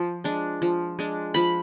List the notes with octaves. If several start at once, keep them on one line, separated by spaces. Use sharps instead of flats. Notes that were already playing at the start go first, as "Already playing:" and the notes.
Already playing: F3
G#3 D4
F3
G#3 D4
F3 B5